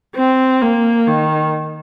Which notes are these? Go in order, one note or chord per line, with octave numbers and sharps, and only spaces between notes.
C4
A#3
D#3